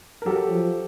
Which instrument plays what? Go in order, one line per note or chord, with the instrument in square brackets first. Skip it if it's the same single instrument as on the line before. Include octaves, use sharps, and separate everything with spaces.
[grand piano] A#4
[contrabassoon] F#3 [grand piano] G4 A4
[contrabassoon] F3